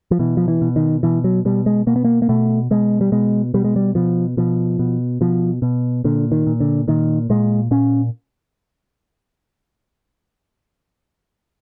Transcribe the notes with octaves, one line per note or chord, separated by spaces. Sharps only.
F3
B2 E3
F3
E3
B2
D#3
B2 E3
F#3
B2 G3
G#3
B2 A#3
B3
A#3
A#3
B2 A3
B2 G#3
G3
B2 G#3
B2 G3
G#3
G3
B2 F3
B2 F3
B2
B2 F3
B2
A#2 D3
D#3
A#2
D3
A#2 D#3
A#2 G#3
A#2 C#4